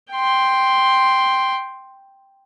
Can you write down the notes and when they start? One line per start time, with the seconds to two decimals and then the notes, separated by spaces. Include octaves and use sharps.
0.12 G5 C6